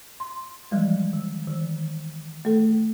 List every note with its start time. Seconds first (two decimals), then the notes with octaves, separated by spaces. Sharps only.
0.20 C6
0.71 E3 F3 G3 G#3
1.13 D#3
1.48 D#3 E3
2.45 A3 A4